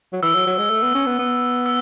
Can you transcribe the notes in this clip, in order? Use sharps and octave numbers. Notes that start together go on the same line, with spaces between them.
F#3
E3 E6
F#3
F#3
G#3
A3
B3
C#4
B3
B3
E6